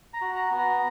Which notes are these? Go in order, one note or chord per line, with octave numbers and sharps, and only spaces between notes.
A#5
F#4
A#5
B3
A#5